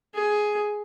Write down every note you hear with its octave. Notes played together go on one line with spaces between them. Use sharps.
G#4